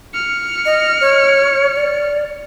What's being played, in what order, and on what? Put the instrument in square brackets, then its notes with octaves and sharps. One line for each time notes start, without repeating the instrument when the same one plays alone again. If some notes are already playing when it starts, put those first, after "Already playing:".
[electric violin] F6 C#7
[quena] D#5
C#5
D5